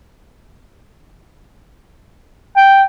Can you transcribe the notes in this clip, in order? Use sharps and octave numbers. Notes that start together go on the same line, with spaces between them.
G5